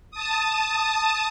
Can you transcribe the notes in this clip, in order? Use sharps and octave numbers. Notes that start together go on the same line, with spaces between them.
A5 D#6